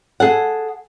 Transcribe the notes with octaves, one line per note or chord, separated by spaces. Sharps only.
G#4 A4 F#5